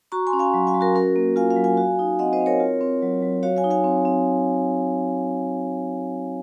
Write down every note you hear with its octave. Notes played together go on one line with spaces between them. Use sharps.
F#4 A#5 C#6
G#5 C6
C#4
F5 G#5
F#3
F5 G#5
F#3
F#4 A#4
C#4 F#4 A#4
A#3
F4 F5 G#5
F5 G#5
F#3
F5 G#5
F#4
D#4
C4 D#5 F#5
C5 D#5
C4
A#4 C#5
F4
C4
F#3
F#3
F#4 C#5 F5
F5 G#5
D#4
F5 G#5
C4
C4